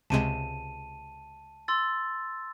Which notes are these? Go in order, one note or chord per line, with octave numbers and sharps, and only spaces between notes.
C#2 C3 G#3 A5 D#7
C6 E6 A6